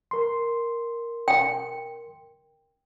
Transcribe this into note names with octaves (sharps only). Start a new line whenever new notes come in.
A#4 C6
G5